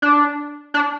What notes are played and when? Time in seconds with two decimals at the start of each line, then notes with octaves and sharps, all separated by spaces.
0.02 D4
0.74 D4